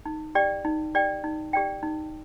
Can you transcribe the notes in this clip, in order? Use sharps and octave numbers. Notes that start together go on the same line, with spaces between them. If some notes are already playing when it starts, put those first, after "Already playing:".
D#4
G4 D5 G5
D#4
G4 D5 G5
D#4
G4 D5 G5
D#4